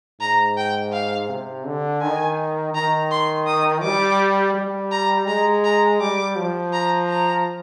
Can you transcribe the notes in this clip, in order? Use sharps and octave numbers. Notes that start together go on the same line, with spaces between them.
G#2 A#5
G5
F5
C3
D3
D#3 G#5
D#3 A#5
C6
D#6
G3 D6
G3
A#5
G#3 A#5
A#5
G3 D6
F3
A#5
A#5